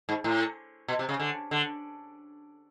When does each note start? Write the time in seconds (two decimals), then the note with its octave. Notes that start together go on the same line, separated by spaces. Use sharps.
0.09 G#2
0.24 A2
0.88 B2
0.99 C3
1.09 C#3
1.20 D3
1.51 D3